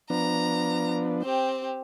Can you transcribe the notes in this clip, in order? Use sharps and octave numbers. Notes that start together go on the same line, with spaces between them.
F3 B3 D4 A#5
C4 G4